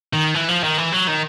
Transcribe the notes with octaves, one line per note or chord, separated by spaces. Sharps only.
D#3
E3
F3
D#3
E3
F#3
D#3